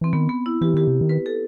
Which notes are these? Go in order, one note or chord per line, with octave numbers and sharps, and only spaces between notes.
E3 C4
D#3 B3
B3
E4
E3 G4
D#3 G4
C3
D#3
B4
A4